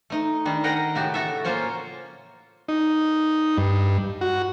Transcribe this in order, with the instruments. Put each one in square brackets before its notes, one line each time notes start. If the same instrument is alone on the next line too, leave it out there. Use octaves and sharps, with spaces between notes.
[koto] A3 D#4
D#3 G3 D4
G#4 A#4 D#5 F#5 G5 A#5
A2 C#3 F#4 G4 A5
F#4 A4 C#5 E5
A#3 C#4 F4 C5 C#5
[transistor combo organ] D#4
G2
F#4